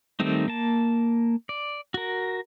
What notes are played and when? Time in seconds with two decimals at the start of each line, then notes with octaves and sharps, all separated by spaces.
0.20 D#3 G3 A3 C4 D#4
0.48 A#3 A5
1.49 D5
1.94 F#4 A#4